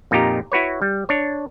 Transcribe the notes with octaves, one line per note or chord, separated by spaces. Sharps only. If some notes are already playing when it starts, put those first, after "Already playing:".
F2 A#2 D#4 F4 G4 A#5
E4 F#4 B4 C#5
G3
D4 C#5